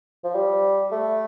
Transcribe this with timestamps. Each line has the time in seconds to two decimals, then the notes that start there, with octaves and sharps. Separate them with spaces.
0.24 F3
0.35 G3
0.91 A3